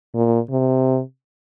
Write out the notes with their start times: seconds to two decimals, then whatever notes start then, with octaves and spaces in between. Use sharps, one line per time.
0.14 A#2
0.50 C3